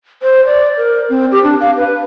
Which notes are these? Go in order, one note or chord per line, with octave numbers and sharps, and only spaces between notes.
C5
D5
A#4
C4
G4
D4
F5
B4